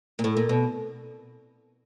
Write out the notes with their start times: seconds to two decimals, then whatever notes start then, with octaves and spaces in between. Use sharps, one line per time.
0.19 A#2
0.24 A2
0.37 A#2
0.49 B2